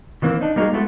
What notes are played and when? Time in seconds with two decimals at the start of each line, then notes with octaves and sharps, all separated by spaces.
0.22 D#3 E3 A#3 C4
0.41 D4 D#4
0.56 G3 A#3 D#4 E4 F#4 G#4
0.73 G#3 A3 B3 E4 F#4 A4